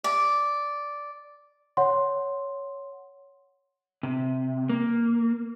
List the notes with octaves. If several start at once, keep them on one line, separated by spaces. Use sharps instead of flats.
D5
C#5 F#5 C6
C3
A#3